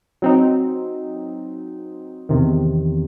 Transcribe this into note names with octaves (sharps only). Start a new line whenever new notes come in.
F#3 C4 D#4
E2 C3 D#3